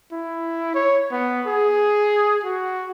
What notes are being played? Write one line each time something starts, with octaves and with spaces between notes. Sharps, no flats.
E4
C#5
B3
G#4
F#4